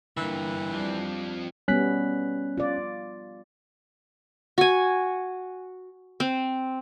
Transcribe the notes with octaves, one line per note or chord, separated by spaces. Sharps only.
G2 D3 E3 A#3
F3 G3 C4 D4
G3 B3 C#4 F#6 B6
F4 D5
F#4 G#5
C4